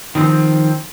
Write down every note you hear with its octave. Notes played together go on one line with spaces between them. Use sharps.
D#3 F3 C4